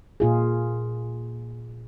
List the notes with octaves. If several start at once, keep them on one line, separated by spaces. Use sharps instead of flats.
A#2 F4 G#4